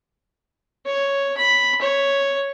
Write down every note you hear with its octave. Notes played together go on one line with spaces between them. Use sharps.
C#5
B5
C#5